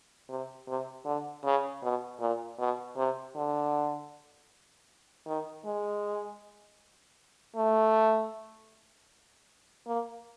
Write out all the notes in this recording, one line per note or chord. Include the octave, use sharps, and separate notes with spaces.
C3
C3
D3
C#3
B2
A#2
B2
C3
D3
D#3
G#3
A3
A#3